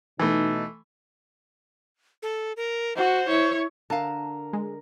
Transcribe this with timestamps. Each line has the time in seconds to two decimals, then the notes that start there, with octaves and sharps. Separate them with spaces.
0.20 B2 E3 A3 D#4
2.23 A4
2.57 A#4
2.96 F#4 C5
3.27 E4 C#5
3.90 D3 A#4 F5 A5
4.53 G#3